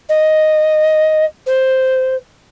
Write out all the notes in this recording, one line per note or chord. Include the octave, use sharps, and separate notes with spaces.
D#5
C5